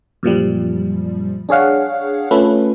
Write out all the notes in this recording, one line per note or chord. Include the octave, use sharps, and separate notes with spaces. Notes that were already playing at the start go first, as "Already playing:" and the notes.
F#2 A#2 F3 G3
D4 G#4 C#5 F5 F#5
A3 C#4 F4 A4 B4